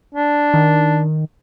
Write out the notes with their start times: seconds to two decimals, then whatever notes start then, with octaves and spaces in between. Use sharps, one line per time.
0.15 D4
0.54 D#3